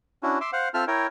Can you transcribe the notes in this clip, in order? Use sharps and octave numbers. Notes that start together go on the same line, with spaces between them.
C#4 D4 E4 F#4
E5 C6 D6
C5 F5 F#5
C4 F4 A4 E5 A5 F6
E4 A#4 C#5 G5